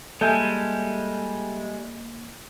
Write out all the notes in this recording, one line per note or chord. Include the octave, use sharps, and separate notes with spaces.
G3 G#3 A#3 A4 E5 G#5 G6